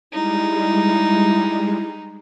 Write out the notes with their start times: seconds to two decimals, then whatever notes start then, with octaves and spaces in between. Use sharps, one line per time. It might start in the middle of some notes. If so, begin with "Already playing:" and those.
0.13 G3 G#3 D#4 E4